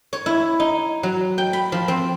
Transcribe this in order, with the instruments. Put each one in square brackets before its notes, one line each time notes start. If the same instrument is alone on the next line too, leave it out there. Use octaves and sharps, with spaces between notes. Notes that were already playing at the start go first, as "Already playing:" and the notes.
[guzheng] C#5
E4
D#4
F#3
G5
B5
F3
C4